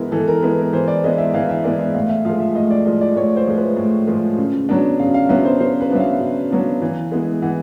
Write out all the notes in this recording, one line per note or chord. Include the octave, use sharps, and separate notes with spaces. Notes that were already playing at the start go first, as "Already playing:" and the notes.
Already playing: E3 G#3 B3 E4 A#4 B4
E3 A4
A#4
G#3 B3 E4 B4
A#4
E3 C5
D5
G#3 B3 E4 D#5
E5
E3 F5
E5
G#3 B3 E4 D5
E5
A2 F5
E5
F3 G#3 F5
E5
A2 D#5
D5
F3 G#3 D#5
D5
A2 C#5
C5
F3 G#3
B4
A2
F3 G#3
C#3
F#3 B3 D4
C#3 F5
F5
F#3 B3 D4 E5
C5
C#3 C5
B4
F#3 B3 D4 E5
F5
C#3
F#3 B3 D4
E3
G#3 B3 E4
E3 F#5